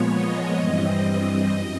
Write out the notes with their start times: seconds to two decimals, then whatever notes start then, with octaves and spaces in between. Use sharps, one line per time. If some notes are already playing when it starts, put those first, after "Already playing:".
Already playing: A#2 F3 G#3 B3 C#5
0.10 D#5
0.56 G2 E3 G3 C4
1.49 F#2